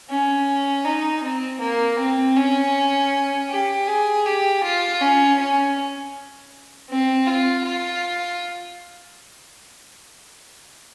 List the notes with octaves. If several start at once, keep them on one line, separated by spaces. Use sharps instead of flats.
C#4
D#4
C4
A#3
C4
C#4
G4
G#4
G4
F4
C#4
C#4
C4
F4
F4